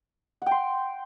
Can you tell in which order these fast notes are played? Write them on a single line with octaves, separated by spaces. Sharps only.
F#5 G5 C6